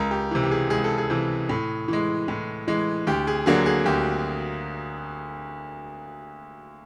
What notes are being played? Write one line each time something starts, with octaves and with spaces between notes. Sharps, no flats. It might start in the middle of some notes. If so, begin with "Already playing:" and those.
Already playing: C#2 A#4
G4
C3 E3
G4
G#4
C#2 G#4
A4
G#4
C3 E3
A2
E3 G#3
A2
E3 G#3
D2 G4
G#4
D3 F#3 A#3 G#4
G#4
D2 G4